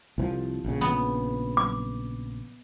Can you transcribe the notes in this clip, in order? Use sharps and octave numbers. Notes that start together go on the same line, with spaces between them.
C2 E3 F3
A#1 C#3
B3
D6